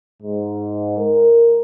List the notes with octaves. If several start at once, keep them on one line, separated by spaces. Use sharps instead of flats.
G#2
A#4